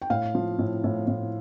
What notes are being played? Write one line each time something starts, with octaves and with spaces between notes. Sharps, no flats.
G5
A2 F5
F3
A2
A2
A2